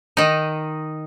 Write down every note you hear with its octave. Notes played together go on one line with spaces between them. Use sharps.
D#3 D#4